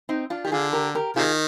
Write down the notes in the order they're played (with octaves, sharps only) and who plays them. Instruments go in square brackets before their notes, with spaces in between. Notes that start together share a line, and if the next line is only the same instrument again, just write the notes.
[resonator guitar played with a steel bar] C4 D#4
D4 F4
[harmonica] D#3 [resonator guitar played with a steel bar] G4
[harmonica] D3 [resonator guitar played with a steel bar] F4 G#4
[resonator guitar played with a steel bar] G4 A#4
G4 A#4
[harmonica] C3 D#3 [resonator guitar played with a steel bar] F4 G#4